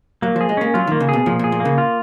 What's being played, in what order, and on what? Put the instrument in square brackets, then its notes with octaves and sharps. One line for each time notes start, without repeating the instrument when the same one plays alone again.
[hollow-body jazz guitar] F#3 [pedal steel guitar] A#3
[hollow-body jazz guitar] F3 [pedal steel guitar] G#4
[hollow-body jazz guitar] G#3
[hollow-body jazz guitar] A#3 [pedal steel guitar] C#4
[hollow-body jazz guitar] F#3 [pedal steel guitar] F4
[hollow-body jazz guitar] D#3 [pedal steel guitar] A#3
[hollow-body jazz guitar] C#3
[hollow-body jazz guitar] B2 [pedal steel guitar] G#4
[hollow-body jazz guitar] A#2 [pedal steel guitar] F3
[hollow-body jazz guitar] A#2
[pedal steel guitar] G#4
[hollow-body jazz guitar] A#2
[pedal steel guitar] A#3
[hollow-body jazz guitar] C#3
[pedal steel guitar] F4